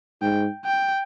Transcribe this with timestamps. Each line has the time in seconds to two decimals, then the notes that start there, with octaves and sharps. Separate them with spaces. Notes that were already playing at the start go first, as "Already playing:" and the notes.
0.22 G#2 G5
0.65 G5